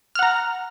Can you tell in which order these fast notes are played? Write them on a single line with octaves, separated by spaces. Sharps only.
F6 F#5 A#5